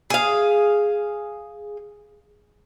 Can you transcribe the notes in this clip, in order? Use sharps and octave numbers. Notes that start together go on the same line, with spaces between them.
G#4 F5